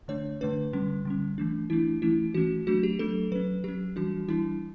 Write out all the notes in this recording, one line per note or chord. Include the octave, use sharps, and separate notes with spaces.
D3 A3 D4 C#5
D3 A3 D4 B4
D3 G3 C#4
D3 G3 C#4
E3 A3 D4
E3 A3 D4 E4
E3 A3 C#4 E4
E3 A3 C#4 F#4
F#3 A3 D4 F#4
G4
F#3 A3 D4 A4
F#3 C#4 B4
F#3 C#4 G4
E3 G3 D4 F#4
E3 G3 D4 E4